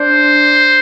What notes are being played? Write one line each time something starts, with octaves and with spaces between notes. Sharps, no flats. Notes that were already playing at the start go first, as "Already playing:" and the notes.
Already playing: D4 C5